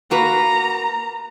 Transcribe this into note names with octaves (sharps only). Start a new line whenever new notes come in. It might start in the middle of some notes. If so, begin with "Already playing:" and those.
A#3 F#4 B4 A#5